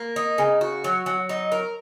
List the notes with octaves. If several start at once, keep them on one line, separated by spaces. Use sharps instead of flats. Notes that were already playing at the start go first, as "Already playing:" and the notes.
Already playing: A#3
D#4
C#3
F#4
F#3
F#3
D#4
A#4